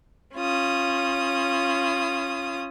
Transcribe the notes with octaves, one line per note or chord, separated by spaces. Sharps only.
C#4 F4 D#6